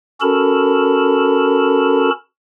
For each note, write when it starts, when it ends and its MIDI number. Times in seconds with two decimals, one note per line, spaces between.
0.21 2.10 61
0.21 2.10 66
0.21 2.10 69
0.21 2.10 70
0.21 2.10 81
0.21 2.10 83